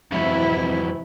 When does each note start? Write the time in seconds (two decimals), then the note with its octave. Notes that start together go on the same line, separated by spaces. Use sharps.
0.12 F2 G#2 C3 E3 F#3 E4